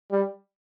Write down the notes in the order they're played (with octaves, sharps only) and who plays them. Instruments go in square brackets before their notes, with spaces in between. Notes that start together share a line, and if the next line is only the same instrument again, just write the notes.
[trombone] G3